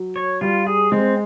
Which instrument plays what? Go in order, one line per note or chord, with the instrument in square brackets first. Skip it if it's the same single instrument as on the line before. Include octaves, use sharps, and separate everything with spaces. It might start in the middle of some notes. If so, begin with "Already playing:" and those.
Already playing: [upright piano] F#3
[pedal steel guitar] C#5
[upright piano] G3 [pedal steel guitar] F4
[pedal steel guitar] G#4
[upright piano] G#3 [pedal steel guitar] C4